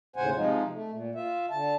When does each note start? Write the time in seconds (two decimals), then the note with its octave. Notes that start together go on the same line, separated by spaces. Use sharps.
0.16 D#2 A2 C#3 C5 F#5 G#5
0.36 C3 F3 G#3 D#4 F4
0.70 A3
0.91 A#2
1.15 F4 E5
1.51 D3 A5